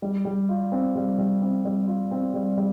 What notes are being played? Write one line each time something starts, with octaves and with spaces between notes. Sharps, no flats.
G3
G3
F4
C4
G3
G3
C4
G3
F4
C4
G3
G3